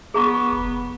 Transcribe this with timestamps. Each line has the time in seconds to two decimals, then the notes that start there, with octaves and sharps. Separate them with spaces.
0.14 B3 G#4 A#5 C#6
0.53 F1